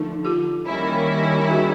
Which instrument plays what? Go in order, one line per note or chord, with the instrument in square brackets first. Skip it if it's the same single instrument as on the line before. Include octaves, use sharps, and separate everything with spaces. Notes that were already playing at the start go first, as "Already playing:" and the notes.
Already playing: [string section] D3 F3 A3 [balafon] D#4
[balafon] F4 G4
[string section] D#3 G3 A#3 C#4 E4
[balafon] F#4 G#4